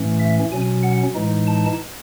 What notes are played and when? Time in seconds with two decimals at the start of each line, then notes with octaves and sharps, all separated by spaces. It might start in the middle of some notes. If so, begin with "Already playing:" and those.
Already playing: A2 E3 A3 C#4
0.20 E5
0.52 B2 F#3 C#4 G#5
0.83 F#5
1.15 A2 E3 G#3 D#4
1.47 A5